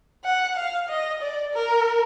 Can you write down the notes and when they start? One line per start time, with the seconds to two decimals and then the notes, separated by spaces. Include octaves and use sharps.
0.24 F#5
0.56 F5
0.89 D#5
1.21 D5
1.53 A#4